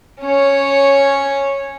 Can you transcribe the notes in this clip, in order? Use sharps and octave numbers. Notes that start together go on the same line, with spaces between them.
C#4 C#5